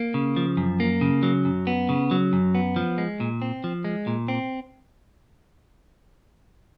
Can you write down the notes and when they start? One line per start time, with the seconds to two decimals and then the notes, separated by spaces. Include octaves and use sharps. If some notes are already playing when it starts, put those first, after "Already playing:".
Already playing: A#3
0.14 C#3
0.37 F3
0.57 F#2
0.80 A#3
1.01 C#3
1.23 F#3
1.45 F#2
1.67 B3
1.89 C#3
2.11 F#3
2.33 F#2
2.55 B3
2.76 F3
2.98 G#3
3.20 A#2
3.42 C4
3.64 F3
3.84 G#3
4.07 A#2
4.28 C4